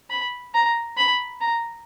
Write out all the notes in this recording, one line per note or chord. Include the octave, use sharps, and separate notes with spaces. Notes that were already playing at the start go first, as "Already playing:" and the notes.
B5
A#5
B5
A#5